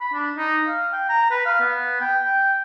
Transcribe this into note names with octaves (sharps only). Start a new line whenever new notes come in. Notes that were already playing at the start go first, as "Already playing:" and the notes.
B5
D4
D#4
F5
G5
A#5
B4
F5
B3
G5
G5